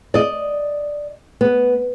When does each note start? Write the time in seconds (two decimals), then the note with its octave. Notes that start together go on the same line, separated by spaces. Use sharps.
0.14 D5 D#5
1.41 B3